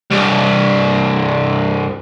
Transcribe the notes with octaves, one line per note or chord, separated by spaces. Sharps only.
C2 G2